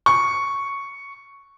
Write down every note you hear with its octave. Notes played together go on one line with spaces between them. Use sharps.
C#6